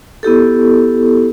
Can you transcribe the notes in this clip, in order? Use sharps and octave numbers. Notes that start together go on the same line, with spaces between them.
B3 E4 G4 A4